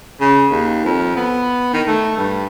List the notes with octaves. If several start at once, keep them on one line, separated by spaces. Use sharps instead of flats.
C#3
D#2
F2
B3
D#3
A3
G2